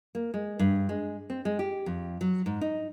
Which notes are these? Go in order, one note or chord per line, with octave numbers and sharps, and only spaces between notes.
A#3
G#3
G2
G#3
C4
G#3
G4
F2
F#3
G#2
D#4